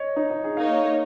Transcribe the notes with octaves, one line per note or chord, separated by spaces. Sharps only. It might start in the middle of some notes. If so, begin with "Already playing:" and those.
Already playing: C#5 D#5
D#4
D#4
G#4
A#3 D#4 C#5 F5